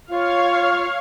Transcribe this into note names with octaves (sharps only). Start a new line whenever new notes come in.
F4 C#5 F5